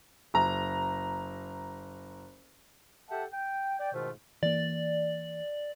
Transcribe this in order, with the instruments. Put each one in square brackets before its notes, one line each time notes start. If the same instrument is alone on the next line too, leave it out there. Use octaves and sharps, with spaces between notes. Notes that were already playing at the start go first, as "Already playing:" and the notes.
[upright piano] F#1 A#5
[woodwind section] G4 A4 E5 F#5 G5 A5
G5
D5 G5
G#2 B2 D#3 A3 F4 C5
[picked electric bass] E3 A#3 [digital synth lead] D5